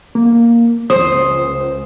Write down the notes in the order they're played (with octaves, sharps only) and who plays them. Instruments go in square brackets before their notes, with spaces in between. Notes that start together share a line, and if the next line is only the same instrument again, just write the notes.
[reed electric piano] A#3
[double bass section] C#2 [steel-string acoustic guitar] C5 [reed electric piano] D#6